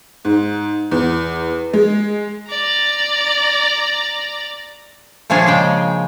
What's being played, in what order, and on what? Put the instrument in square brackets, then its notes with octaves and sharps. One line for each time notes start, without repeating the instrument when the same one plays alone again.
[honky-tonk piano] G#2
E2
G#3
[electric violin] D5 A#5
[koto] A#2 F3 A#3 C#4 D4 G#4
C#3 G#3 G5